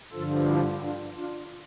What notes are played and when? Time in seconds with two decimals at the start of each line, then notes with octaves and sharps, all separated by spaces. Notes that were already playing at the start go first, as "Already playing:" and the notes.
0.12 G2 D3 F3 F4 A4
0.46 E4 G4
0.80 D4 F4
1.15 D4 F4